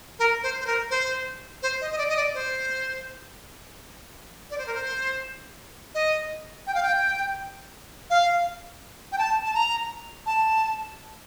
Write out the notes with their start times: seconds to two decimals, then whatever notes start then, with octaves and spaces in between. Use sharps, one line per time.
0.19 A#4
0.43 C5
0.60 C5
0.67 A#4
0.90 C5
1.63 C5
1.81 D#5
1.91 D#5
1.98 D5
2.09 D#5
2.17 D5
2.34 C5
4.51 D5
4.58 C5
4.66 A#4
4.74 C5
5.95 D#5
6.67 G5
6.75 F5
6.83 G5
8.10 F5
9.12 G5
9.18 A5
9.45 A5
9.54 A#5
10.26 A5